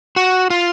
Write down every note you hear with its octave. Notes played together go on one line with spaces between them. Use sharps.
F#4
F4